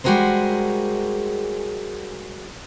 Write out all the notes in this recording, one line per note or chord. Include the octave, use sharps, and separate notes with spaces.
G3 G#3 F#4 G#4 A#4 C5